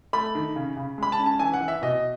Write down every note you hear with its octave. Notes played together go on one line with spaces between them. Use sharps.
A3 B5
D#3
C#3
C#3
G#3 B5
A5
C#4
A5
E3 G#5
F#5
E3
E5
B2 D#5